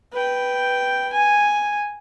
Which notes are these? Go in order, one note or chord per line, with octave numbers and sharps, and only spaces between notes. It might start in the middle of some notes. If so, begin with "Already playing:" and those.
B4 G5
G#5